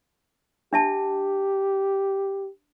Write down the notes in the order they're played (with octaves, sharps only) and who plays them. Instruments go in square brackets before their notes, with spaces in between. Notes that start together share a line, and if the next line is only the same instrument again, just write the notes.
[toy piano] D4 E5 A5 [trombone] G4